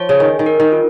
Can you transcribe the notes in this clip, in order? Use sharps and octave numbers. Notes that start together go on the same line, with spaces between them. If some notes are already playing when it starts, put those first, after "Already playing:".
Already playing: F3 C#5
C#3
D#3 G#5
D#3
A#4
D#3
F4